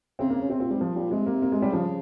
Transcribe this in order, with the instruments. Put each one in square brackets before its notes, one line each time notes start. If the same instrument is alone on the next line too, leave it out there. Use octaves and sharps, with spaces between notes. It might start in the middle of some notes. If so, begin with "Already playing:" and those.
[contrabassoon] C#3 [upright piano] C4
[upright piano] A#3
C#4
[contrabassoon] C3 [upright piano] C4
[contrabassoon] A#2 [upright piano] C4
[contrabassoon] G#2 [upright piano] G3
[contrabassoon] A#2 [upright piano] F3
[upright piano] G3
[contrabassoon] C3 [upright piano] G#3
[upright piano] A#3
A#3
G#3
G3
[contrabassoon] C#3 [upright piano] F3